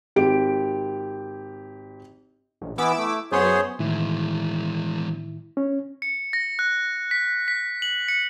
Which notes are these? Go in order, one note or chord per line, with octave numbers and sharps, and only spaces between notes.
G#1 G4 D7
A#1
E3 B3 E4 D6 E6
A3
F#2 B3 G#4 C5 C#5 C6
A2 D#3 E3 G#3 E4
C#4
C#7
A#6
F#6
B6
B6
F#7
C#7